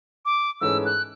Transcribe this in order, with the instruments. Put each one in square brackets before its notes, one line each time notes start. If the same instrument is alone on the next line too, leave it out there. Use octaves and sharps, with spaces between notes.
[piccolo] D6
[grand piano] G#2 E3 A3 C#4 G#4 [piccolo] E6
[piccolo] F#6